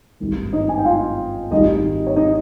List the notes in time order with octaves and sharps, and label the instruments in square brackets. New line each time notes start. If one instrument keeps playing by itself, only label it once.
[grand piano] G#1 G2 D#3 G3
D#4 D#5
G#5
G5
F4 F5
G#1 G#2 D#3 G3 D#4 D#5
C#5
D#4 D#5